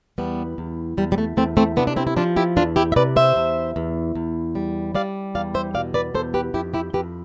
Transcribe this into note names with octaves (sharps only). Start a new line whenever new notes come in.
E2 G3 B3
E2
E2 G3
G3
A3
E2 A3 C4
A3 C4
C3 B3 D4
D4
C4 E4
E4
F3 D4 F4
E4 G4
E2 D4 F4
E4 G4
E5
C3 B4 D5
C5 E5
E2
E2
E2
G3
G3 D5 F5
E2 D5 F5
C5 E5
B2 D5 F5
B4 D5
E2 A4 C5
G4 B4
F2 E4 G4
E4 G4
F2 G4 B4